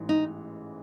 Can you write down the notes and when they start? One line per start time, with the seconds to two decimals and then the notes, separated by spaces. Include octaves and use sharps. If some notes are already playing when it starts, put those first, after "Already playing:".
Already playing: A1 G#2 E3
0.09 D#4